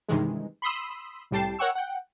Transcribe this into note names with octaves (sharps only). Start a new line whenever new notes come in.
G2 C3 D#3 E3 G#3
B5 C6 D#6 E6
C2 A2 G3 G5 A5 C7
A#4 C#5 F#5 G5 C#6 E6
F#5 G5